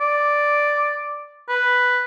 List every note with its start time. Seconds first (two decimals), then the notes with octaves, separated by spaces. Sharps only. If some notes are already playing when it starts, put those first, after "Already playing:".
0.01 D5
1.48 B4